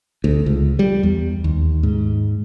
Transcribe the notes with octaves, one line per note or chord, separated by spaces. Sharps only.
D2
C#2
G3
E2
D#2
G#2